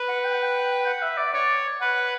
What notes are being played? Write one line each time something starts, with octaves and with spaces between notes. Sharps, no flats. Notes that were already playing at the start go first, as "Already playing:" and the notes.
Already playing: B4
F#5
G5
F#5
G5
F#5
E5
D5
C#5 D5
B4 F#5